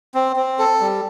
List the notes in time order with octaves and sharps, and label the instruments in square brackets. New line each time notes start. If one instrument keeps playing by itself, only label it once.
[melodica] C4
C4
A4
G3